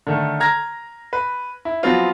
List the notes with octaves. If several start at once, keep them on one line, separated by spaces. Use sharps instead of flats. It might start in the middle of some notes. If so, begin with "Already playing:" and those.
D3 D#3 A3
A#5 F6 G#6 A#6
B4
E4
F3 F#3 B3 C4 F4